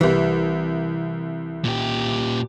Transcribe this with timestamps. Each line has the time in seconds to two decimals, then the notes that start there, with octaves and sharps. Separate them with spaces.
0.01 C2 E3 G3
1.64 A#2 G4